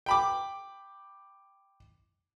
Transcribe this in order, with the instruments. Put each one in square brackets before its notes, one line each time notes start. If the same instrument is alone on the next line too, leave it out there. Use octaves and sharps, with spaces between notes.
[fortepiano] G5 B5 D6